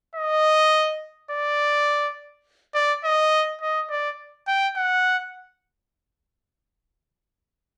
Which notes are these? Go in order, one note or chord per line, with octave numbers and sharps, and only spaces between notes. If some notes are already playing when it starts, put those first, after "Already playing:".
D#5
D5
D5
D#5
D#5
D5
G5
F#5